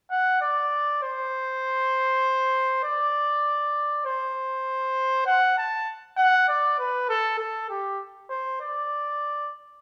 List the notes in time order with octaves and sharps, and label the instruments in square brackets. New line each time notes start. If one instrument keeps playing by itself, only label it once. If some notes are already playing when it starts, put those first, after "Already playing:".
[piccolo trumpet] F#5
D5
C5
D5
C5
F#5
A5
F#5
D5
B4
A4
A4
G4
C5
D5